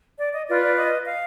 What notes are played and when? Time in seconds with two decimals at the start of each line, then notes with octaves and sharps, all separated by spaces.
0.19 D5
0.33 D#5
0.47 F4 B4 D5
0.63 D5
0.77 D#5
1.06 F5